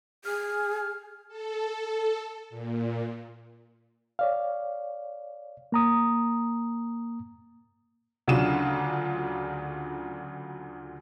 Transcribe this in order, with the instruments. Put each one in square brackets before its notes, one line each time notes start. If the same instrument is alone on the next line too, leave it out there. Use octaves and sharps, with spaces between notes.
[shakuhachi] G#4 [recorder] F6
[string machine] A4
A#2
[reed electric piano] C#5 D5 F5
A#3 A#5 D#6
[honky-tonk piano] D2 C#3 F#3 D4 F4 E7